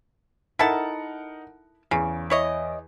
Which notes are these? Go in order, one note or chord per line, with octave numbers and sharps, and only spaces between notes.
D#4 E4 A4 A#4 F#5 A5
E2 C#3
E4 C#5 D#5